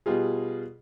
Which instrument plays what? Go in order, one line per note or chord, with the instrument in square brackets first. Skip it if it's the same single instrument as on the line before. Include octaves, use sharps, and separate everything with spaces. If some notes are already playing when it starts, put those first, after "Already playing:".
[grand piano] B2 G3 F4 G#4